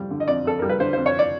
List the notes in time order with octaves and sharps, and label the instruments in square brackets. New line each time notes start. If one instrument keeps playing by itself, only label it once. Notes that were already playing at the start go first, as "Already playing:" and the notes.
Already playing: [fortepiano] F2 G3
D3
D#5
F2 D5
F2 A4
G3 A#4
B4
D3 C5
C5
F2
C#5
D5